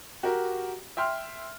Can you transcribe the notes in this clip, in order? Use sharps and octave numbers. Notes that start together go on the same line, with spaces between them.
F#4 G4 A#4
E5 G5 C6 F6